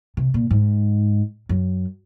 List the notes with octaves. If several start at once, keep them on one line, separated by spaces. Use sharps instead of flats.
C3
A#2
G#2
F#2